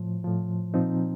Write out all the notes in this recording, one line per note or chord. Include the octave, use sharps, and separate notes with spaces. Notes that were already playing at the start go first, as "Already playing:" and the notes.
Already playing: A2 F3
A2 F3
A#2 F3 C4 D#4